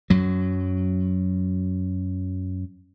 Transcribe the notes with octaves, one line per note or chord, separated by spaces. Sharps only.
F#2 F#3